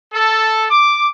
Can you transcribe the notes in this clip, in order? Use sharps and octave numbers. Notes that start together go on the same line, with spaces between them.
A4
D6